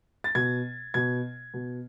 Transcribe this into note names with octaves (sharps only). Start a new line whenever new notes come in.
A6
B2 G#6
B2 G#6
B2